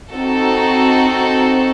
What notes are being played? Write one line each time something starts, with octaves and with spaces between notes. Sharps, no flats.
C4 D#4 F#4 A4